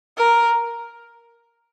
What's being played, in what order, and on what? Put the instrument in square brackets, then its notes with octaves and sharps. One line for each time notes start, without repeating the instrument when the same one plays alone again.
[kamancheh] A#4